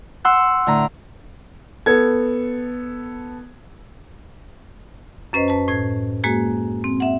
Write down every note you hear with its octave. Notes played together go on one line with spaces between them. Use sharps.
F#5 C6 E6 F#6
A2 D3 A#5
B3 A4 G#6
F#2 C#4 B4 C5 D#5
B4 A5
A2 G#6
G#3 A#3 F#4 G#4
C4
E5 F#5